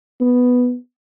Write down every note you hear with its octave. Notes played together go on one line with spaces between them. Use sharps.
B3